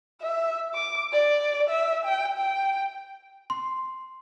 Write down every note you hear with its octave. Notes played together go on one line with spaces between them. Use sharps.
E5
D6
D5
E5
G5
G5
C6